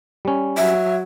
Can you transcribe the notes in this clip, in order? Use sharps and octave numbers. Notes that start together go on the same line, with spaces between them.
G3 C#4
F#3 E5